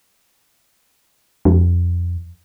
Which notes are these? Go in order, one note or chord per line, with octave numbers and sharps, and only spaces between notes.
F2